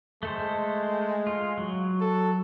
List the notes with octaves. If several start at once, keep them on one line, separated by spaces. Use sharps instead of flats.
G#3 A3 A4 C5
F4
F#3
A4